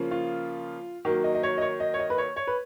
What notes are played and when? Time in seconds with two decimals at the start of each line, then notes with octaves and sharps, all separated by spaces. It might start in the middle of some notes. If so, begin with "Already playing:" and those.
Already playing: C#3 F3 A#3
0.11 F4
1.05 D#3 F#3 A#3
1.24 D#5
1.35 D#5
1.43 C#5
1.58 D#5
1.62 C#5
1.80 D#5
1.94 C#5
1.99 D#5
2.10 B4
2.18 C#5
2.36 C#5
2.47 B4